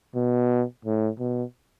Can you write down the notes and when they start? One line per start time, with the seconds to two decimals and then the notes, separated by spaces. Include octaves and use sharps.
0.15 B2
0.85 A2
1.19 B2